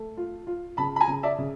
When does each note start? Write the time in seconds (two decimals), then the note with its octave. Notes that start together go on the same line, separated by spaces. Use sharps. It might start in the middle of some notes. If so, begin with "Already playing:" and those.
Already playing: A3
0.17 F4
0.47 F4
0.77 C#3 A5 B5
0.96 B5
1.00 G#5 A#5
1.08 C#3
1.23 D5 E5
1.38 C#3